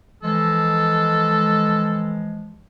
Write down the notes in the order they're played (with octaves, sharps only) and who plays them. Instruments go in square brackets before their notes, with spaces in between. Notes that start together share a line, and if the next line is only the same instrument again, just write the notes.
[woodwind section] E3 F3 G#3 [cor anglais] A4